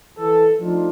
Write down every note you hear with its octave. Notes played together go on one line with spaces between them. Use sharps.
E3 A4
F3 A3 D4 D#4 F4